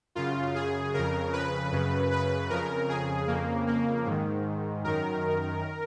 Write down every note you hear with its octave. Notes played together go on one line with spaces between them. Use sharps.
F#2 C#3 F4
G#4
F2 C#3 A#4
B4
F#2 C#3
B4
F2 C#3 A#4
G#4
F2 C#3 A#3
A#3
G#2 D#3
F#2 D#3 A#4